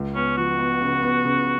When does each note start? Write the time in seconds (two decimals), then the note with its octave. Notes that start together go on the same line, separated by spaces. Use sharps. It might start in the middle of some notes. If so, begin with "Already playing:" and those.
Already playing: C#2
0.15 B3 C#4
0.37 F3 F#4
0.59 B3
0.81 C#3
1.03 B3
1.25 C#3